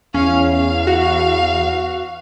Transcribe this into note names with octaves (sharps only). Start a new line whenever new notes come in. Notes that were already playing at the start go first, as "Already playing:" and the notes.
E2 C#4 F5
F5
F#4